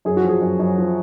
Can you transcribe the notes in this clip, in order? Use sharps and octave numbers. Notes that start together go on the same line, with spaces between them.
F#2 G#4
F#4
F3
G#4
F#2
F#2
F3